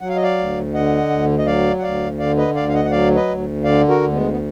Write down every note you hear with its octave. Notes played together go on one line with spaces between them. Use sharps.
F#3 F#5
F5
D#5
D5 F5
D2
D3 D#5 F#5
D2
D#5
F#3 D5 F5
F#5
D2 D5 F5
D3 D5 F5
B4 D#5
D2 D5 F5
F5
D#5 F#5
F#5
F#3 D5 F5
B4 D#5
D2
D3 D5 F5
F#4 A#4
D2
G#3 B3
B3